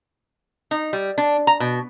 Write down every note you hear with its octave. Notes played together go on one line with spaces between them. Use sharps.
D#4
G3
D4
A#5
B2